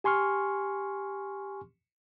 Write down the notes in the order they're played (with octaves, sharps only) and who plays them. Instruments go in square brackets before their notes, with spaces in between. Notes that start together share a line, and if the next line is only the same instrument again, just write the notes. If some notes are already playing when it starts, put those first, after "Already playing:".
[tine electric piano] G4 G#5 C6 C#6 F6